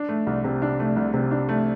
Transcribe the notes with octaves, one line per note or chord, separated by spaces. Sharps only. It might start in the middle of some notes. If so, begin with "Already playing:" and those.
Already playing: D4
A3
C2
C3
D4
A3
C2
C3
D4
A3